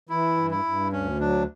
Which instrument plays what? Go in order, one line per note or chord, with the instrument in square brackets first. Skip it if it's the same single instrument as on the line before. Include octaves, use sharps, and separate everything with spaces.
[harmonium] E3 [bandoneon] E4
[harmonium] G2
[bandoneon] E4
[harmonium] G2
[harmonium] D2 [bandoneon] C#4
[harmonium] F#3 [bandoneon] D4